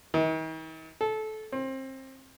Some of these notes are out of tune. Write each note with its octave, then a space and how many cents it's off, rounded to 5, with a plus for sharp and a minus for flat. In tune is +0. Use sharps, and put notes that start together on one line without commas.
D#3 +45
A4 -20
C4 +25